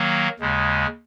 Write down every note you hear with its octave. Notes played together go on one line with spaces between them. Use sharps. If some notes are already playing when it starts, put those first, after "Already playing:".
Already playing: D#3 F#3 A#3
D#2 C#3 G#3